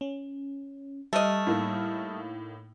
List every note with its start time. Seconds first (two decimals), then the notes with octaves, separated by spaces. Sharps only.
0.01 C#4
1.13 G3 A3 D#5 D#6 F6
1.47 A2 A#3 D#4